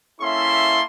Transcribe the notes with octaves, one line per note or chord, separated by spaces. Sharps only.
A#3 C#4 E4 A4 E5 C6